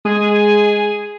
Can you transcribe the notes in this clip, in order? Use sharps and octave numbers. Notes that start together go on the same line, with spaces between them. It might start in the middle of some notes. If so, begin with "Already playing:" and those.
G#3 G#4